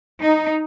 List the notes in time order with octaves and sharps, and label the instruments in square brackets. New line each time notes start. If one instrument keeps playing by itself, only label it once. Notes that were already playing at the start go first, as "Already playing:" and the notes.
[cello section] D#4